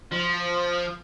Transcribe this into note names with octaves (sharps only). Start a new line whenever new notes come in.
F3